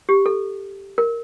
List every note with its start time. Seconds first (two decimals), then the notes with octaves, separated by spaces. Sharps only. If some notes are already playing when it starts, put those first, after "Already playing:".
0.09 G4
0.26 A4
0.98 A#4